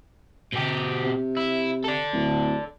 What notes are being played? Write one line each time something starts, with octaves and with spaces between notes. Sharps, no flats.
B2 G4
C3
E4
A4 D5
D1